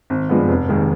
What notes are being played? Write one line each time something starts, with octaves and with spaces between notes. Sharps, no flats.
G#1
G2 F3 G#3 B3
F1
D#2 D#3 G#3